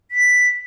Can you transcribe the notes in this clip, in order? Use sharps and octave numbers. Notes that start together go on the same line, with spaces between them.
B6